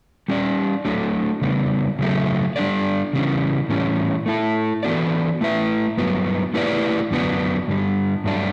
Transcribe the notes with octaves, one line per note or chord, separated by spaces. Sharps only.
G3 C#4 G4 D5
F#3 A3 D4 A4
C#3 G3 B3
C#3 F#3 A3
G3 D4 A4 D5
C#3 E3 G3 C#4
A2 E3 G3 C#4
A3 E4 A4
E3 B3 F#4 A4 D5
A3 E4 B4 E5
G2 F#3 B3
A3 E4 G4 B4 D5
F#2 D3 F#3 B3 D4
G2 D3 G3
G2 F#3 A3 D4